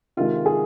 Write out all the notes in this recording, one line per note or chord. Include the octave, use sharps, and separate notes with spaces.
C3 D#3 G#3 F4
G#4